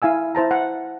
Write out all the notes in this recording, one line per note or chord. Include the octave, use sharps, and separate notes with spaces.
E4 F5 G#5 E6
E4 C5 A5 A#5
F#5